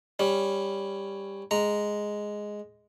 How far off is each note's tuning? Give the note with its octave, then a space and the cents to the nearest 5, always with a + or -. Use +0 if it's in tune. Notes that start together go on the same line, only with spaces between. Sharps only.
G3 +10 C#4 +0
G#3 +0 A#5 +0